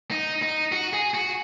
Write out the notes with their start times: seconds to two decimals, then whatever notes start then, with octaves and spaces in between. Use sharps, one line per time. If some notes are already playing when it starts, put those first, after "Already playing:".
0.11 D#4
0.42 D#4
0.72 F#4
0.93 G#4
1.14 F#4